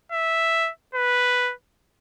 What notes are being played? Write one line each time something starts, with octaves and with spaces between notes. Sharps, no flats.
E5
B4